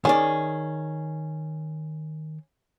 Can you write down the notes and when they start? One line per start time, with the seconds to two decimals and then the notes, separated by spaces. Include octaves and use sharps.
0.05 D#3 C#4 G#4 D5